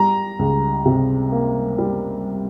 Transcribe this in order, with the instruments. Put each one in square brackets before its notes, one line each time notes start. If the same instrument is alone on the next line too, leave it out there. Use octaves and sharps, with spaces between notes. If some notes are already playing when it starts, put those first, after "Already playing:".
Already playing: [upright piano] G3 A#5
C#2
C3
A#3
G3